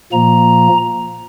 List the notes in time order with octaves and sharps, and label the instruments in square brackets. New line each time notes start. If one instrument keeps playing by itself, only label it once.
[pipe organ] A#2 F3 A#3 A#5